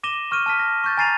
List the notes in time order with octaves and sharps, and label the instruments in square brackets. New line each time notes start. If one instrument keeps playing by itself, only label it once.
[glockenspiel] D6 A#6 D#7 E7 G7
C#6 F6 G6 D#7
A5 F6 B6
A#6
C#6 F6 G6 A6
G#5 A#5 A6 C7 D#7 F7